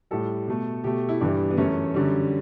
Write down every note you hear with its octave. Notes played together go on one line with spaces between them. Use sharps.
A2 G3 A4
B2 A3
B2 A3 G4
E4
G2 E3 G3 D4
B3
F#2 E3 A3 C#4
F#2 D3 G3